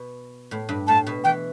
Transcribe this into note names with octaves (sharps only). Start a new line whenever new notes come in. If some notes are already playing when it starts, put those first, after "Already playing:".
Already playing: B2
A2
G2
A2 A5
B2
E3 G5